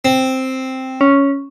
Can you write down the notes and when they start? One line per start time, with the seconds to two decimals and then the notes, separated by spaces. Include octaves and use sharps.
0.05 C4
1.01 C#4